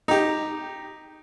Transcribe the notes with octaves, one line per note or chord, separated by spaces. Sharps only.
D#4 G4